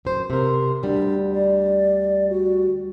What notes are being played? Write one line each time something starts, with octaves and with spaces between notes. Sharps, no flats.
F#2 C5
C3 A#4 C6
D2 G3 D4
D5
F#4